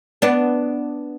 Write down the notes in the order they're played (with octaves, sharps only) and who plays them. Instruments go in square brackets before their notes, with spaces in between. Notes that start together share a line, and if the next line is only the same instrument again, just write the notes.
[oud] B3 D4